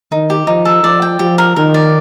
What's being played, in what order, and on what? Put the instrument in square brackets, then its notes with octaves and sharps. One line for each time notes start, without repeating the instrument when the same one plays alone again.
[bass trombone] D#3 [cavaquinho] D#4
[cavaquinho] G4
[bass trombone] F3 [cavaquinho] D#4
[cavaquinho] A4
[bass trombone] F3 [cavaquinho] D5
[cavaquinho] G5
[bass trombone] F3 [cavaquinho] G4
[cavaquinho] A#4
[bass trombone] D#3 [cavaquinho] A#4
[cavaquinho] D5